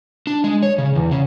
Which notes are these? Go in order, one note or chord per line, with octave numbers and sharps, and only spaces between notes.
D4
G#3
C#5
C#3
E2
C#3